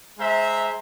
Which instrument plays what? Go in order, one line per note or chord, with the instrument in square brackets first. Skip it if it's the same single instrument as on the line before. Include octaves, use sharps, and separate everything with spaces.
[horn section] G#3 C5 E5 A#5